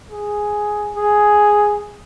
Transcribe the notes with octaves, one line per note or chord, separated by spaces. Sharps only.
G#4
G#4